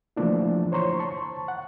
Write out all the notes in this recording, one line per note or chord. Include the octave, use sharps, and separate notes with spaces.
E3 F3 A3 A#3 D4 E4
C5 C#5 A#5 C6 C#6
A5 C#6
F#5